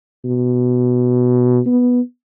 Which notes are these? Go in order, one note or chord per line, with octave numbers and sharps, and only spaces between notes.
B2
B3